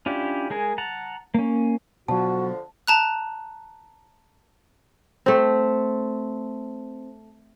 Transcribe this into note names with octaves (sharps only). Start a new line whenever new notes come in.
C#4 D4 E4 F4 G4
G#3 G#4 A#4
F#5 A5 A#5
A#3 C#4
B2 D3 F3 F#3 F#4 A5
A5 A#5 F#6
A3 C4